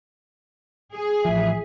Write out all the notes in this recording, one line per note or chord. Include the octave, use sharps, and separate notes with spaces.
G#4
A1 F3 E5